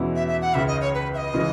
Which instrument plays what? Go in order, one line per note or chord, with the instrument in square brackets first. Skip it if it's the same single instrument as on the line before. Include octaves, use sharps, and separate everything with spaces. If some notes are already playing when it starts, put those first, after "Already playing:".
Already playing: [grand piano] E2 B2 G#3 C#4 E4
[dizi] E5
E5
F#5
[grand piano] C#2 C#3 G#3 D#4 [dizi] E5
[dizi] D#5
C#5
B4
E5
D#5
[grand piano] C#3 E3 G#3